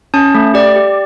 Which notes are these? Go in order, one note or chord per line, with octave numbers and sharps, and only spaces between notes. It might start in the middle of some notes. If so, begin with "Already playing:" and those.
C#4 A5
A3
G4 D5
G4